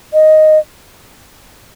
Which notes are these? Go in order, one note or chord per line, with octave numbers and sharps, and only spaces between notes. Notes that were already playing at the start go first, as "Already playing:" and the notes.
D#5